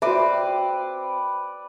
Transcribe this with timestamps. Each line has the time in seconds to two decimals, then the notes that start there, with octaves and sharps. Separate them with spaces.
0.02 C4 F#4 B4 D5 E5